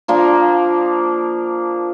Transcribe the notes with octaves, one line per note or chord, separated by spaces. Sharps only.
F3 A#3 D4